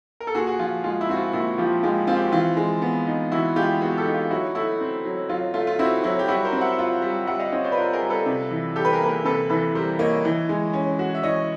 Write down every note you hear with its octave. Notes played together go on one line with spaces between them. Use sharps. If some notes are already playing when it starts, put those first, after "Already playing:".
A#4
A4
A#2 F#4 G#4
F#4 G#4
F3 F4
G#3 F4
E4
C4 F#4
F4
A#2 E4 F#4
F3 F4 G4
G#3 F4 G4
C4 F4
G4
F#4
E3 F4
G#3
B3
D#4
E3 E4 F#4
G#3 F4 G4
B3 F#4 G#4
G4 A4
D#4
F4 G4
F#3 E4 F#4
A3 E4 F#4
C4
F#3
F#3 F4
A3 F4
F4
C4 E4 F#4
F#3 E4
G4
G3 E4 F#4
A#4 C5
C4
E5 F#5
F4
G3
G3 E5 F#5
D#5 F5
C4 C#5 D#5
C5 D5
B4
F4 A#4 C5
G#4 A#4
G3
A4 B4
C3
E3
G3 G4 A4
B4
G#4 A#4
A#3 B4
G#4 A#4
C3 A4 B4
E3 A4 B4
G3 A#4 C5
A#3 C#5 D#5
E3
G#3
C#4
F#4
E5
E3 C#5 D#5